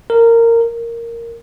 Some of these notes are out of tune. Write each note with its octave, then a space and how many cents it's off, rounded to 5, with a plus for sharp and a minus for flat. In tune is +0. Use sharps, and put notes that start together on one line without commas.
A#4 -15
A#4 -5